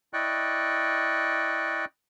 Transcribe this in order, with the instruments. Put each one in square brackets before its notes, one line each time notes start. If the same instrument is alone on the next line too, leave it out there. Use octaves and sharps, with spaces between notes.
[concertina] E4 D5 D#5 G5 C#6 F#6